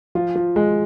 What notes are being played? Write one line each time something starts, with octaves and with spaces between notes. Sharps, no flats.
F3 F4
F3
G#3